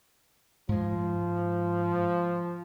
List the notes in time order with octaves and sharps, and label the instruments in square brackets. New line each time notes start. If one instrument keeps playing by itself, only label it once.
[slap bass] G#2 G#3 [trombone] F3